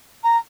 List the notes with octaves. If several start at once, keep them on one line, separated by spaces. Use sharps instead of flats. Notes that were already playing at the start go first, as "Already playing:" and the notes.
A#5